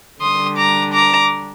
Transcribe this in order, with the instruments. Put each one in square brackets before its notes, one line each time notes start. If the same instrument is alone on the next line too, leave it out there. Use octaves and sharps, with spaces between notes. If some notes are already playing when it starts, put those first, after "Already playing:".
[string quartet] D3 G3 D4 C6 D#6
A#5 D6
A#5 D6